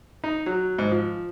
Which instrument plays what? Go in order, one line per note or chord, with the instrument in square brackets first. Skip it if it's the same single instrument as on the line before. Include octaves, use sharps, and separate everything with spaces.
[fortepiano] D#4
F#3
G#2
F3